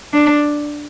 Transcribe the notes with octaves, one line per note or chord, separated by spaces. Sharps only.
D4